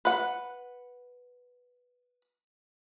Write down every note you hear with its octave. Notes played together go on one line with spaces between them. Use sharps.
B4 F#5